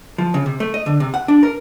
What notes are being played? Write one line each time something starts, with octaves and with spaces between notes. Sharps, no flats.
F3
C#3
C3
A3
D#5
D3
C3
F#5
D4
A#4